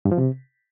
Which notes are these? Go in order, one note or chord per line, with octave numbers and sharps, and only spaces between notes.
G2
F3
C3